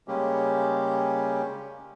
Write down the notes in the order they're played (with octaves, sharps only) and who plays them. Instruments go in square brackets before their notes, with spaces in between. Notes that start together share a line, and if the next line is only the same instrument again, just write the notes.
[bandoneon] C#3 G3 G#3 A#3 C#4 G4